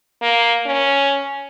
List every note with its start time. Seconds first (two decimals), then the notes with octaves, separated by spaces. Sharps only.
0.22 A#3
0.66 C#4